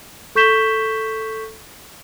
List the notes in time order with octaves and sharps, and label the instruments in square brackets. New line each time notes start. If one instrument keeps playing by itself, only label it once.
[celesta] A4 C#6 G6 B6 E7 G7